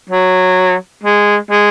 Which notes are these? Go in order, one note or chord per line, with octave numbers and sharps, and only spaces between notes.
F#3
G#3
G#3